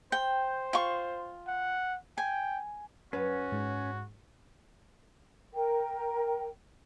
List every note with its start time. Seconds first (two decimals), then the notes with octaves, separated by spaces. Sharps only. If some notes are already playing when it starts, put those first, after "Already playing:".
0.12 C5 G5
0.73 F4 C#6
1.47 F#5
2.18 G5 G#5
3.13 F#2 C#4 F#4 B4
3.52 G#2
5.54 A#4 G5